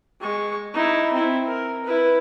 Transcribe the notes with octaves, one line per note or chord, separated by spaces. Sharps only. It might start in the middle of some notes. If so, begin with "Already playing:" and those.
G#3 C#6
D#4 E4
C4 E4
A#4
E4 B4